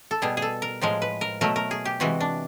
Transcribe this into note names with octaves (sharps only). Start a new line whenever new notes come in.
A4
B2 G3 G#4
G#4
A4
A#4
A2 F3 G#3 A#4
B4
A#4
B2 F#3 A3 A#4
A#4
G#4
G4
C3 E3 G#3 F#4
D4